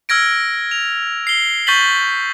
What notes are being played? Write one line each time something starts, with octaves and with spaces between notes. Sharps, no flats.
E6 F6 G#6 A#6 D7
F7
C7 G7
C#6 G6 A6 B6 F#7 G7